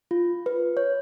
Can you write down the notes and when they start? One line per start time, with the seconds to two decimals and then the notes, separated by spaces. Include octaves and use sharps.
0.11 F4
0.46 B4
0.77 C#5